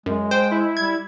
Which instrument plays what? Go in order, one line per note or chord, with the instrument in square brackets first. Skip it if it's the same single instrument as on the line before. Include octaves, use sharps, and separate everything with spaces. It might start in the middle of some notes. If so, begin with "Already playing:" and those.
[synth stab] F#2 [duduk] G#3
[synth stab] C5 [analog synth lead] G5
[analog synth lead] E4
[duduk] G3 [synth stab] G#6